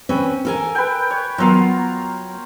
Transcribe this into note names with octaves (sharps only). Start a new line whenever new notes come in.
C4 C#4 B4
A4 A#4 G#5
B4 G5
C#5
F#3 B3 F4 A#4 F5